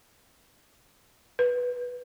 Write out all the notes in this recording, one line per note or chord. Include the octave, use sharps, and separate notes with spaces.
B4